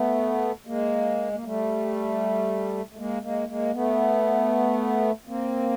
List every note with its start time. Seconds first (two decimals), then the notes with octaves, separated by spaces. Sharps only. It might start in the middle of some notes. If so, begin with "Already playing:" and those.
Already playing: A3 B3
0.67 G#3 A#3
1.32 A#3
1.43 G3 A3
2.92 A3
2.97 G#3 A#3
3.22 G#3 A#3
3.48 G#3 A#3
3.73 A3 B3
5.27 A#3 C4